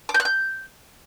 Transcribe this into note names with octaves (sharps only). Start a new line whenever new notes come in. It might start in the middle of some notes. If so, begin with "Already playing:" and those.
D6
G6
F#6
G6